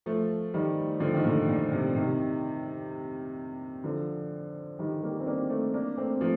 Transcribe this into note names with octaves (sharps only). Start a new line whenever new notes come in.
F3 A3
D#3 G3
D3 F3
D#3
A#2 D3
A#2
C3
C3 D#3
D3 F3
D#3 G3
G3 A#3
C4
A#3 D4
A3 C4
A#3 D4
A3 C4
F3 A3